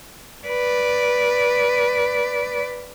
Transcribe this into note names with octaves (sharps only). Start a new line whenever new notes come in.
B4 D5